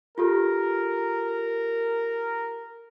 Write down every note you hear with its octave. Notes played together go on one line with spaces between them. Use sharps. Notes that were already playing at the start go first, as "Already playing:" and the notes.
F4 G4 A4 A#4